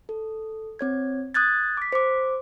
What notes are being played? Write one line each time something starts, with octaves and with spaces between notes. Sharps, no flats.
A4
C4 C#5 G#6
D#6 F#6 G#6 A6
D6 B6
C5 D6